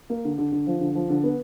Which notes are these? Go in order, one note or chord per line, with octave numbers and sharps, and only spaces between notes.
A#3
D3
D3
D3
F3
D3
F3
D3
B3